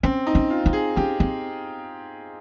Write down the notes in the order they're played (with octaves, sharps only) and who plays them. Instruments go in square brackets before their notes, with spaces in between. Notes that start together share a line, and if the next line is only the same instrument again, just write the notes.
[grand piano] C4 [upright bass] C#4
[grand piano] D#4
[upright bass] C#4
[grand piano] F4
[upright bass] D#4
[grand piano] G#4
[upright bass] C#4 [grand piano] G4
[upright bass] C4